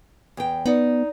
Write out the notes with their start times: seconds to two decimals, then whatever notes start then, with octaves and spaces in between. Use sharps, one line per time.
0.37 E2 G5
0.66 B3 D#4 D5